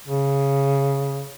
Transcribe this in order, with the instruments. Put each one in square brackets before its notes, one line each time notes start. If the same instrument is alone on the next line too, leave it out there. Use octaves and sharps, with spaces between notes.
[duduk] C#3